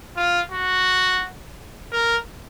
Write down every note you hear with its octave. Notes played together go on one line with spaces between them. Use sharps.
F4
F#4
A#4